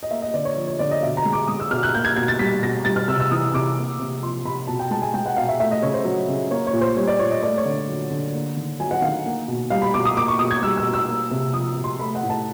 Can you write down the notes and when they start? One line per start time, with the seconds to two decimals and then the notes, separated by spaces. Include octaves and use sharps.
0.03 D#5
0.11 A#3 E5
0.22 D#5
0.34 D3 D5
0.45 C#5
0.57 F3
0.68 C#5
0.79 D3 D5
0.91 D#5
1.02 B2 E5
1.17 A#5
1.25 G#3
1.33 D6
1.48 G#3 D#6
1.60 E6
1.71 B2 F6
1.83 F#6
1.94 A#3 G6
2.05 G#6
2.16 B2 G#6
2.28 A6
2.39 G3 B6
2.62 B2 A#6
2.85 G3 A6
2.96 F6
3.08 C3 E6
3.20 E6
3.31 E3 D#6
3.54 C3 D6
3.77 A#3
3.99 C3
4.22 F3 C6
4.45 C3 B5
4.68 B2 A5
4.79 G5
4.91 G#3 A5
5.02 G#5
5.14 G#3 G5
5.26 F#5
5.37 B2 F5
5.49 E5
5.60 A3 E5
5.71 D#5
5.82 C#3 C#5
5.94 C5
6.05 F#3
6.28 C#3
6.51 A#3 C#5
6.67 C#5
6.73 A#2
6.81 C5
6.97 G3 C#5
7.07 D5
7.19 A#2 C#5
7.31 D#5
7.43 A3 D5
7.58 C#5
7.65 D3
7.89 F#3
8.10 D3
8.33 A#3
8.57 D#3
8.80 F#3 G#5
8.91 F#5
9.02 D#3 F5
9.25 A#3
9.48 B2
9.70 G3 F5
9.82 B5
9.94 B2 D6
10.05 D#6
10.16 A#3 D6
10.28 C#6
10.39 B2 D#6
10.51 G#6
10.62 G3 E6
10.77 E6
10.85 B2
10.93 E6
11.08 A#3
11.31 C3
11.53 F3 D#6
11.76 C3
11.84 C6
11.99 A3 B5
12.15 F#5
12.23 A2
12.30 A5